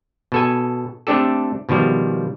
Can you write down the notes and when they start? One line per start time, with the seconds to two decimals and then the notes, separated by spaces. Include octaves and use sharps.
0.32 B2 A4 G#5
1.07 A3 C4 D4 G4 A4
1.69 B2 D#3 F3 G3